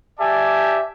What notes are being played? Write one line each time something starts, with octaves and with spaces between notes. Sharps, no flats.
G4 D5 E5 G#5 A5